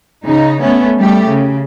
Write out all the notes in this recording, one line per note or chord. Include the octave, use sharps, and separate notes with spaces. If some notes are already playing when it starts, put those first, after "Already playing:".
C#3 D#4
A3 B3 C#4
G3 A3 G4
C#3